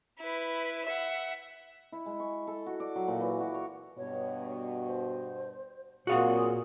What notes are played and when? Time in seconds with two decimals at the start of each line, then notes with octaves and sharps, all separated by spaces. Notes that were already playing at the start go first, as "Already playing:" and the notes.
0.20 E4 B4
0.87 E5 F#5
1.92 E4
2.06 G#3
2.20 C#6
2.47 A4
2.66 F#4
2.80 D5
2.96 F#3
3.08 A#2
3.20 E3
3.40 F#4
3.54 C#5
3.97 G2 B2 C#5
4.87 C5
6.07 D2 A#2 F#3 C4 F#4 G#4 F5 F#5